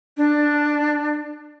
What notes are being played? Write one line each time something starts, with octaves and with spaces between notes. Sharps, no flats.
D4